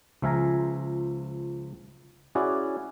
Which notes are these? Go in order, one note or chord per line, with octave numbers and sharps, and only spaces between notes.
C#2 F3 E5 F5 G#5 A#5
C#4 E4 F#4 G#4 D5